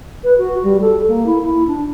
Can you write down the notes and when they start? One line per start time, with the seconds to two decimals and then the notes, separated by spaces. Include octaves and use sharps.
0.24 B4
0.38 F#4
0.64 G3
0.81 A4
1.08 A#3
1.26 E4
1.42 E4
1.67 D4